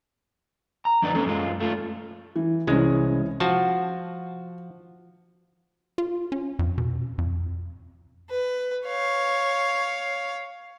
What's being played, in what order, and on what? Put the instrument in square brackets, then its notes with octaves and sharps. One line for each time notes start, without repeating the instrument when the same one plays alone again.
[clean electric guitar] A#5
F2 D3 F#3 D#4 B4 D5
A#3 C4 C#4 A4 B4
F#2 G#3 F4
A3 F4
[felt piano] E3
[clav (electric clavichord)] C2 G#3 [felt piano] E3 C#4
[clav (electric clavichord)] F3 F#4 A5 [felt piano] F#5
[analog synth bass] F4
C#4
F2
B2
F2
[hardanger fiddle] B4
C#5 F5